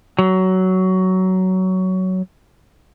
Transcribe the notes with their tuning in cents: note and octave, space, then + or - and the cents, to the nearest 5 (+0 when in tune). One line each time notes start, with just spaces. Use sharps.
F#3 +15